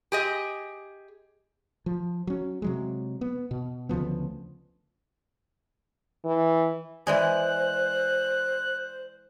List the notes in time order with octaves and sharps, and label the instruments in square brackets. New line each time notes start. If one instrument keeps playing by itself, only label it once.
[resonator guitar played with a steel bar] G4 G#4 D#5
[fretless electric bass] F3
F#3 C#4
C3 F#3 G#3
B3
B2
D2 C#3 F3 B3
[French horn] E3
[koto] E3 G#3 G#4 [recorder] C5 [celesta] D5 G#5 [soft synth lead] F#6